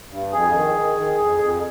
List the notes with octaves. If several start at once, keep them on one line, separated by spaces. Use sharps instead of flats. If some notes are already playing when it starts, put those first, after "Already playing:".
G2
F2 G#4
D#3
D#3
D#3
F2
F2